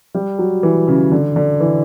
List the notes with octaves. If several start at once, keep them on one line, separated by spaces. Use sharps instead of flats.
G3
F#3
E3
C#3
D3
D3
E3